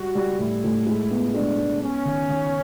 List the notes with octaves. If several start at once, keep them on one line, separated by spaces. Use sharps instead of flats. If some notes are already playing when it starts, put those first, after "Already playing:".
Already playing: G3 F#4
G3
A2 E4
A2
G#3
B3
G#3 D4
G#3
B3 C#4
D#3
D#3